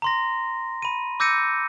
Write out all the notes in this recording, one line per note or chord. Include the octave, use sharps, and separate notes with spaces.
A#5 C6 A#6
B5 D#7
D6 E6 G6 A#6 C#7 D#7